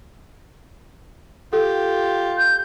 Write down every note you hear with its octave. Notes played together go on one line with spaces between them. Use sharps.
F4 G4 A4
G6